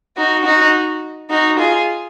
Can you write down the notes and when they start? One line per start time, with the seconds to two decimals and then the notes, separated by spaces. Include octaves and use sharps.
0.16 D#4 F#4
0.44 D#4 F#4
1.29 D#4 F#4
1.58 F4 G#4